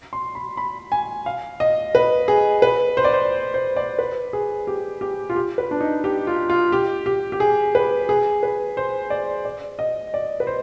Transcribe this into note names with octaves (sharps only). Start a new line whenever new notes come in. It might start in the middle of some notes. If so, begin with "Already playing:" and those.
C6
B5
B5
G#5
F5
D#5
B4
G#4
B4
C5
D5
C5
C5
D5
B4
G#4
G4
G4
F4
G4
B4
D4
D#4
G4
F4
F4
G4
G4
G4
G#4
B4
G#4
B4
C5
D5
D5
D#5
D5
B4
C5